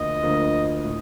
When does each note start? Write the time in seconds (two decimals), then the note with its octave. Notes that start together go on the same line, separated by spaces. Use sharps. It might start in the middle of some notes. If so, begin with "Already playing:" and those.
Already playing: D2 D3 F3 A#3 F4 D#5
0.23 D2 D3 F3 A#3 F4
0.85 A2